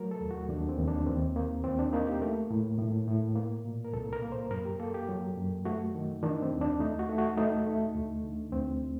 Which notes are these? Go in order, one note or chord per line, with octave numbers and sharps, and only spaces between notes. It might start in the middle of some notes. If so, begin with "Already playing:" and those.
Already playing: F#3 A3 A#4
A4
D#2
F#4
D#2 D4
C4
D#2
D4
D#2 C4
A#3
D#2 C4
D4
A#3 D#4
G4
A3 A#4
A2
A2
A2
A#3
A#2
A#4
C2 A4
A#4
A#3
C5
F#2 A#4
G4
A#3 A4
G4
F#3
F#2
A3 F#4
D#3
D#3 D4
C4
D#2
D4
A3 D#4
F#4
A3
F#4
A3 D#4
A3
D2
D3
D2 C4